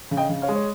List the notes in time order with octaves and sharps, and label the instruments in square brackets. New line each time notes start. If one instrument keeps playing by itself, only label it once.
[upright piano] C#3
D#5 G5
C#3
C#5 F5
G#3
C#5